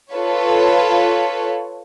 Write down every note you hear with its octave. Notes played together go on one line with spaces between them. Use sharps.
F4 A4 B4 C#5